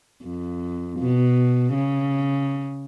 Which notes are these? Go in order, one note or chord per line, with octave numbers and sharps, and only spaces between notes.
F2
B2
C#3